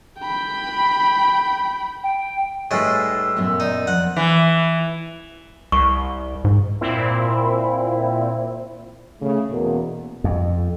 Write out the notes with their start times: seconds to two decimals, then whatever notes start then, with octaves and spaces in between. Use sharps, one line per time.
0.19 G5 B5
2.04 G5
2.71 A2 G3 G#3 D#4 B4 A5 E6
3.37 F#2 A#2 B3
3.60 D#4 D5
3.87 F2 F#5
4.17 E3
5.72 C2 C#6
6.45 G#2
6.81 A#2 C4 E4
9.22 C#3 A3
9.51 E2 B2 A#3
10.24 F2